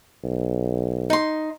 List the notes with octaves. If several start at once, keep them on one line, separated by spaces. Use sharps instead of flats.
B1
D#4 C6